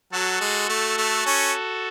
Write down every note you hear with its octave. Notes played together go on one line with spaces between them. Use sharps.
F#3 F#4 A4
G#3
A3
A3
C#4